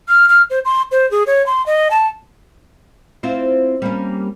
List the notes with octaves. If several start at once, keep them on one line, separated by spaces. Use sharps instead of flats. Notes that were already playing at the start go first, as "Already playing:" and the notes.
F6
F6
C5
C6
C5
G#4
C#5
C6
D#5
A5
C4 E4 F4
G3 A#3 C#4